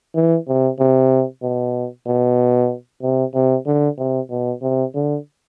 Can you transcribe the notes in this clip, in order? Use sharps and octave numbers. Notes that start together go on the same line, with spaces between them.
E3
C3
C3
B2
B2
C3
C3
D3
C3
B2
C3
D3